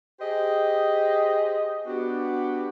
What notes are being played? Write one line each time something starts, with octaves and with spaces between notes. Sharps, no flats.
G4 G#4 C5 D#5
B3 D4 F#4 G4